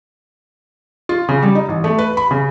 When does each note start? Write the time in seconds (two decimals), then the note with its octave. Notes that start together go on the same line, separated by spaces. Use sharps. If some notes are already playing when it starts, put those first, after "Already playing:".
1.09 F4
1.29 C#3
1.42 G3
1.55 D#4
1.69 A1
1.84 A3
1.98 B4
2.17 B5
2.31 C#3